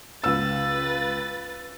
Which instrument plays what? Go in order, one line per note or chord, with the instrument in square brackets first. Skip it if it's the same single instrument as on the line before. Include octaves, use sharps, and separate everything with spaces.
[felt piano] C#2 E6 [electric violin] B4 A6